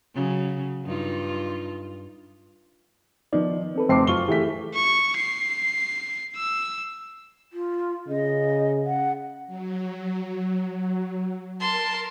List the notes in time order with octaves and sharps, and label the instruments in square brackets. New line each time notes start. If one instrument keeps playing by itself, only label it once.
[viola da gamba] C#3 F#3
G2 D#4 F4
[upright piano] D#3 [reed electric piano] F3 B3 D5
[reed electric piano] C4 A4 B4
[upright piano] F1 C7 [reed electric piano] C4 A5 D6
[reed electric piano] F#2 F#3 C#6 [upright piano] F4 G7
[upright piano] E3 A3 B6 [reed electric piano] G4 G#4
[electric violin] C#6
C7
E6
[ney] F4
[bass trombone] C#3 [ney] D#5
[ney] F#5
[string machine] F#3
[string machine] A#4 [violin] A5 C6